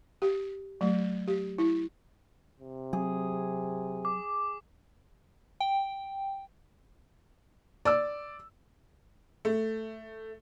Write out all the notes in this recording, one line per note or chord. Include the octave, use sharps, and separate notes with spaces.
G4
F#3 A3
G4
E4
C3
F#3 C4 G#4
D6
G5
D5 D6 E6
A3